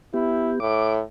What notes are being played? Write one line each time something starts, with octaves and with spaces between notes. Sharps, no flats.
B3 E4 G4
A2 D6